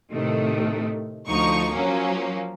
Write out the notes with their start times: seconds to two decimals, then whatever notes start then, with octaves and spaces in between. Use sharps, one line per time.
0.12 A2 C3 D#3 A3
1.28 D2 F3 D#4 C#6
1.73 F3 F#3 A#3 C#4